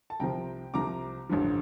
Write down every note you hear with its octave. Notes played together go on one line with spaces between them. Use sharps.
A5
C2 C3 F3 G5 A#5
C2 C3 F3 A#5 D6
A1 G2 D3 F3